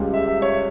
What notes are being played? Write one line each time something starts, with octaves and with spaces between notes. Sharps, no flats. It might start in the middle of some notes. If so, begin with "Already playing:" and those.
Already playing: C#2 C#3 G3
E5
E5
C#5